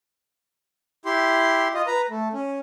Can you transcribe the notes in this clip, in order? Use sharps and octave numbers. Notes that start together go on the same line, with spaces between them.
E4 G4 C6
F4 D#5
B4 A#5
A3
C#4